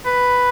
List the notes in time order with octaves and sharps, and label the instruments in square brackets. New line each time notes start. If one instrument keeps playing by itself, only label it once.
[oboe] B4